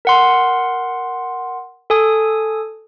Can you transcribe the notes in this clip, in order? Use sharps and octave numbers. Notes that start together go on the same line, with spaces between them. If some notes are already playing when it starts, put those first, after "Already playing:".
A#4 F#5 C6
A4 G#5 D#6